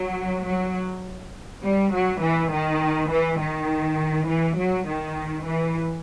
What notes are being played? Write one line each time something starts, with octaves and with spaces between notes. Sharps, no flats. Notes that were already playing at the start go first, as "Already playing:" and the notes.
Already playing: F#3
F#3
G3
F#3
E3
D#3
E3
D#3
E3
F#3
D#3
E3